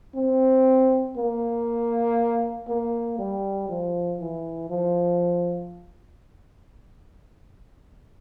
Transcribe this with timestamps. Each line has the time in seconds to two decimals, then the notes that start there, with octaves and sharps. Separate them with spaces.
0.15 C4
1.17 A#3
2.68 A#3
3.19 G3
3.69 F3
4.20 E3
4.70 F3